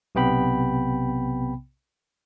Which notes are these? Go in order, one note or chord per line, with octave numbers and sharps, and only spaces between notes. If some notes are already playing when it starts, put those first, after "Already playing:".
B1 C3 B3 G5 B5